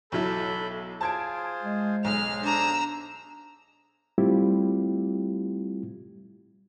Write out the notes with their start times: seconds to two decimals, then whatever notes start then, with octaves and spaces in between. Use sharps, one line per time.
0.12 B1 F#3 E4 A4 B5 G6
1.01 F4 G#4 C5 A5 G#6 D7
1.63 G#3
2.04 B1 G#4 C5 F6
2.44 D4 A#5 E6
4.18 G3 A3 C4 E4 F4 G4